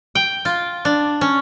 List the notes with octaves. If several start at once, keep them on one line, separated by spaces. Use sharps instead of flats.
G5
F4
D4
C#4